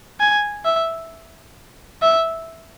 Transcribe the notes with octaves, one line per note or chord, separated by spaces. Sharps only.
G#5
E5
E5